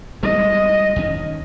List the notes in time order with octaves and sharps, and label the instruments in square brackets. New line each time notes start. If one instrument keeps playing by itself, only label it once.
[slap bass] G3 G#3 [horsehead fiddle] D#5
[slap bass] D#2 D#3 C#4